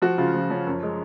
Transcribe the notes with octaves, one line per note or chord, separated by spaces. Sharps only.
F3 F#4
C#3 F4
F3
F3 C#4
F#2
G#3